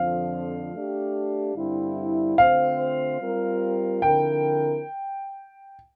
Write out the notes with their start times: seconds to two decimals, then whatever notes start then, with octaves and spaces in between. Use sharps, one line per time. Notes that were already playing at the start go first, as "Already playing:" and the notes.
Already playing: F2 D3 F3 F5
0.74 A3 D4 G4
1.55 G2 D3 G3 C4 E4
2.38 D3 A3 C4 F4 C5 F5
3.20 G3 C4 F4 A#4
4.02 D3 F3 C4 E4 A#4 G5